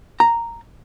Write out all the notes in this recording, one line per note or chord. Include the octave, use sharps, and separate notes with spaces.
A#5